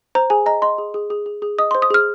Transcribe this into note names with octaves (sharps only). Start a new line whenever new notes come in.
C5 A#5
G#4 G#5
D#5 A#5
D#5 C6
G#4
G#4
G#4
G#4
G#4
D#5 D#6
C6
C5
D#6
G#4 F6